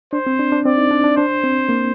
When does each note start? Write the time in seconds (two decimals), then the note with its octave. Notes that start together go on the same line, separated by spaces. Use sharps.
0.13 D4 C5
0.27 C4
0.39 D4
0.52 D4
0.65 C4 D5
0.78 D#4
0.91 D4
1.04 D4
1.17 D4 C5
1.44 C4
1.69 A#3